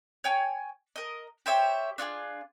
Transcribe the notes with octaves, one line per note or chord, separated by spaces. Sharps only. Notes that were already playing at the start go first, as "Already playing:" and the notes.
C#5 G5 G#5
A#4 D#5
G4 C5 C#5 E5
D4 F4 F#4 G#4